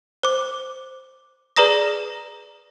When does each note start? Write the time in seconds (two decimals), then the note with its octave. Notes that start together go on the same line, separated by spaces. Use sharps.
0.23 C5 D6
1.56 G#4 B4 D5 A#5 D#6 A#6